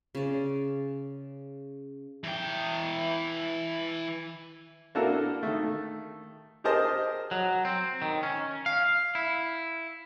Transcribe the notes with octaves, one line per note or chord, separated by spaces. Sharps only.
C#3 D5
E3 G5
A#3 D4 E4 F#4 A4 A#4
D#3 A3
G4 G#4 A#4 C5 D#5 A5
F#3
C4
D#3
C#4
F5
E4